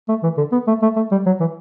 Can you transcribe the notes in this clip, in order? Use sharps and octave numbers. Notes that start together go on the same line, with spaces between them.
A3
E3
D3
B3
A3
A3
A3
G3
F#3
E3